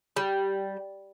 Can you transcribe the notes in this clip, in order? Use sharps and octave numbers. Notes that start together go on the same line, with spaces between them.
G3